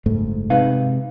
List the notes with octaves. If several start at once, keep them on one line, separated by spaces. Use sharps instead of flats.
F#1 G#2 A3
C3 G#3 D#4 B4 F5